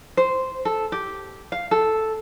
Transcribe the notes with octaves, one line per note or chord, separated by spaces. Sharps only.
C5
A4
G4
F5
A4